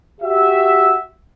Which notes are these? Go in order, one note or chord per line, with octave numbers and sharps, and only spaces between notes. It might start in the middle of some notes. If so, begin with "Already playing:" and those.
F#4 G4 E5